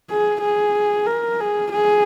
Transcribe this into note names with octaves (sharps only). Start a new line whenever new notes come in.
G#4
G#4
A#4
G#4
G#4